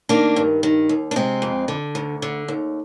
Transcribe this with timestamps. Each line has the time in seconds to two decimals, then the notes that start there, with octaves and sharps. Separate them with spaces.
0.09 D#3 A#3 D4
0.36 G2
0.63 D#3
0.89 D#2
1.11 D4
1.16 C3 G#3 C4
1.42 F2
1.68 D3
1.95 D2
2.22 D3
2.48 D#2